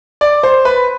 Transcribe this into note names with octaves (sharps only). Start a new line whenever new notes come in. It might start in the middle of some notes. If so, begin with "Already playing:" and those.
D5
C5
B4